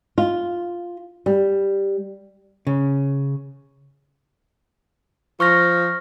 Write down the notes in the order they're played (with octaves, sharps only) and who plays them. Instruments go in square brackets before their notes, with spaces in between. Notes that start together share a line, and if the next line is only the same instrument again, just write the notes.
[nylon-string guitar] F4
G3
[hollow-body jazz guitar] C#3
[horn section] F3 [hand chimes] C#6 F6 A#6